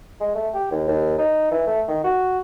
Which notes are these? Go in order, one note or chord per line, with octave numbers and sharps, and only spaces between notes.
G#3
A3
G4
D#2
D#2
D#4
E3
A3
D#3
F#4